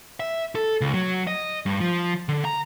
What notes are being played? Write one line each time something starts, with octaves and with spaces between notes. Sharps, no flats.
E5
A4
C#2
F#3
D#5
G2
F3
D3
A#5